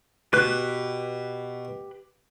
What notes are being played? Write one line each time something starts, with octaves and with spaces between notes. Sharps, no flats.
B2 G4 B4 F#6